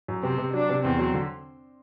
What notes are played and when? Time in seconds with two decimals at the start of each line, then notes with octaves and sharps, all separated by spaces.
0.08 F#2
0.23 C3 C4
0.38 C3
0.53 F#3 D4
0.69 C3
0.84 E2 C4
0.99 F#3
1.14 D3